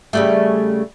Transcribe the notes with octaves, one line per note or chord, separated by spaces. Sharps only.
C#3 G3 A3